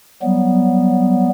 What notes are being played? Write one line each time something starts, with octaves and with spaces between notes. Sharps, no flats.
F#3 G3 B3